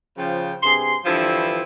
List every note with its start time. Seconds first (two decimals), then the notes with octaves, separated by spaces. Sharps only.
0.17 C#3 F3 G5
0.63 G2 C3 G#4 C6
1.06 G2 D3 E3 F3 C4 E4